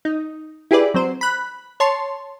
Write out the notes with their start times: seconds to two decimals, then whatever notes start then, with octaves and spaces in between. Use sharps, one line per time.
0.05 D#4
0.71 E4 G4 G#4 B4 D5
0.94 F#3 C4 C5
1.21 B5 F#6
1.80 C#5 A5 C6